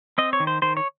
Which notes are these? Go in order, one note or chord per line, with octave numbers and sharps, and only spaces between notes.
C4 D#5
C#5
D#3
C5
D#3 C5
C#5